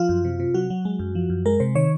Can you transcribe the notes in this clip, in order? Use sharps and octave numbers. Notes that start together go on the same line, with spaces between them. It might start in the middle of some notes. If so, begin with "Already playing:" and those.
Already playing: F3 F4
F#2
C3
C3
F#3 F#4
F#3
G#3
F#2
F3
F#2
G#3 A#4
C3 C5
D#3 C#5